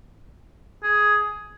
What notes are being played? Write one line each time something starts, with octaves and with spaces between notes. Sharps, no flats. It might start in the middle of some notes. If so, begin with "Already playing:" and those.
G#4